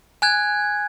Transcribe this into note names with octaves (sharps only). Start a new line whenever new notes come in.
G#5 F#6 G#6